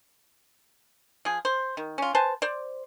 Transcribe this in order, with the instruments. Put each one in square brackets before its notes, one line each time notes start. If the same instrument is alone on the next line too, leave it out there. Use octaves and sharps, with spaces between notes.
[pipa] F3 G#4
C5
D#3
C#4 F4
B4 C5 G#5 A5
C5 D5